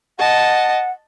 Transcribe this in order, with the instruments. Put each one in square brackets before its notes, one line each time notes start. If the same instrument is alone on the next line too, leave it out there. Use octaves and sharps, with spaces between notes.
[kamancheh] D#5 A5 [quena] F#5